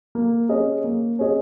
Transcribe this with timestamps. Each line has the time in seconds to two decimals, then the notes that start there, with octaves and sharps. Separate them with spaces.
0.15 A#3
0.49 C#4 G#4 D#5
0.84 A#3
1.19 C#4 G#4 D#5